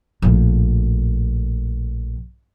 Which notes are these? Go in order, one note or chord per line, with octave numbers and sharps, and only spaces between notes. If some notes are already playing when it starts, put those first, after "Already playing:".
A#1 A2